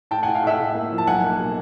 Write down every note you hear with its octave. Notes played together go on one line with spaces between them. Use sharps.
A2 G5 A5
A2 F#5 G#5
F5 G5
A2 E5 F#5
A2
A#3
F3
A5
B1 F#5 G#5
A#3
B2